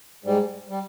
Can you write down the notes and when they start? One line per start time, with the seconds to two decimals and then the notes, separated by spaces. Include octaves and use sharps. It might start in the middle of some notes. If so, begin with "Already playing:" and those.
0.24 G#2 G3
0.69 G3